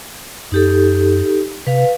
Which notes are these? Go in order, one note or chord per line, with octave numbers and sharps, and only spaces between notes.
F#2 D#4 G4 A4
C3 B4 F5